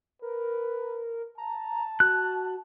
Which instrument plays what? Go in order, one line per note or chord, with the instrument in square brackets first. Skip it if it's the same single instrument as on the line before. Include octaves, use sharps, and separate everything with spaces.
[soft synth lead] A#4 [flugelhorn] B4
[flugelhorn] A5 [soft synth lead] A#5
[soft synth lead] F#4 [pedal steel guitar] F#6